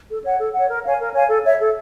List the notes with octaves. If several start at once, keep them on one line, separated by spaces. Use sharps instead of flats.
A4
C#5 F#5
A4
C#5 F#5
A#4
C#5 F5 G#5
A#4
C#5 F5 G#5
A4
C#5 E5
A4